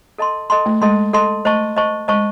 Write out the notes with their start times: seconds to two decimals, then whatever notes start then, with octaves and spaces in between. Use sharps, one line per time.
0.18 A4 D#5 A5 C6
0.50 A4 D#5 A5 C6
0.66 A3
0.81 G#3 A4 D#5 A5 C6
1.13 A4 D#5 A5 C6
1.45 A3 C5 D#5 A5 C#6
1.76 C5 D#5 A5 C#6
2.08 G#3 C5 D#5 A5 C#6